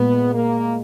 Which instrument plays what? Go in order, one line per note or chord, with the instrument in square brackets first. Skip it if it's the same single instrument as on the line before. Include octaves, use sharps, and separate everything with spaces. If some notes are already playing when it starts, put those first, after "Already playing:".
Already playing: [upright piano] A#2 G#3 [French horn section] B3
[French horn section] A#3